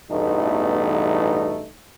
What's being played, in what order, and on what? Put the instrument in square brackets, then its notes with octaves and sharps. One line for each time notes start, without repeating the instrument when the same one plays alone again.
[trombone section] A1 E2 G2 B2 A3 D#4